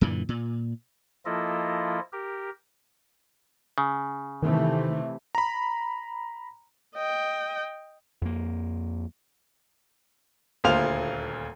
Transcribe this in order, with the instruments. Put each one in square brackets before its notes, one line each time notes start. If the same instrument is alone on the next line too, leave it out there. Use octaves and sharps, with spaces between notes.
[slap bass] F#2 A#2 D3 E3
A#2
[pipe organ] F3 A#3 E4 F4 A4 D#5
G4 A#4
[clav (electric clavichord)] C#3
[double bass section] C3 E3 A3 [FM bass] D#3
[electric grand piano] A#5 B5
[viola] D#5 G5
[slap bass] F2 A#3
[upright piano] D#1 D2 A#2 C5 F5 F7